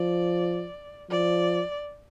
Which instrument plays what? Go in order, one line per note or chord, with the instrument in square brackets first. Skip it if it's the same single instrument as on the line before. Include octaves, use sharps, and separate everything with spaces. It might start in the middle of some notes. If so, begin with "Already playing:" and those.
Already playing: [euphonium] F3 [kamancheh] D5
[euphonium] F3 [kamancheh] D5